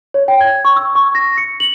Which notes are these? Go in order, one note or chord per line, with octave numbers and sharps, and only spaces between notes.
C#5
G5
G#6
C#6
E6
C#6
A#6
C#7
F#7